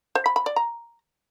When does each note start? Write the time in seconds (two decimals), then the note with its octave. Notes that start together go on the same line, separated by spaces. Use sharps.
0.15 C5
0.26 B5
0.36 B5
0.46 D5
0.56 A#5